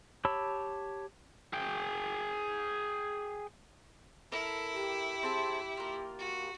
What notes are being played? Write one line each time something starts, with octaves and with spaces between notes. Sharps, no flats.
G4 C#5 A5 B5 E6
G#4 G5
E4 A4 A#4 F6
G4
C4 G#4 A5
A#3 F4
F#4